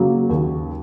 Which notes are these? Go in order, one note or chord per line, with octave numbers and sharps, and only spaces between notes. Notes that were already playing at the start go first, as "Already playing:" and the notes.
Already playing: C#3 F#3 A#3
D#2